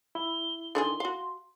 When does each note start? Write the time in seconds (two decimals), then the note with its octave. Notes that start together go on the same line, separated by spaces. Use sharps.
0.15 E4 G7
0.75 D3 D#3 G#4 C6
1.00 F#4 F5